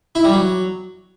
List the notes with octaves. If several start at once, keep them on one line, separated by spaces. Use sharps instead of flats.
E4
G3
F#3